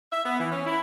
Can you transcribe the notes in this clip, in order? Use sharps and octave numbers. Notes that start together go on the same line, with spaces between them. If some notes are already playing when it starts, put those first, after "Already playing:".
E5
B3
E3
C#4
E4